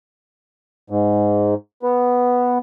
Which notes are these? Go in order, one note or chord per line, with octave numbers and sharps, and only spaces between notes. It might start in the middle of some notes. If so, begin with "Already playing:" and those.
G#2
B3